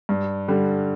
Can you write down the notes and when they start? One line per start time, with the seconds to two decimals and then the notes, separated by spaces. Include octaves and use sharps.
0.09 G2
0.48 D3 G3